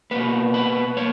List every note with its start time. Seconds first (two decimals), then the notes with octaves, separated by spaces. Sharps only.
0.11 B2 A#3 B4
0.54 B4
0.97 A#3 C#5